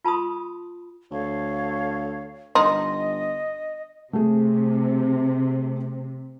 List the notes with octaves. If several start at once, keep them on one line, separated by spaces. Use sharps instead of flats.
F4 A5 B5 C6 D#6
D2 A4 C#5 F5
G1 D#4 D#5 C6
C3 A3 G#4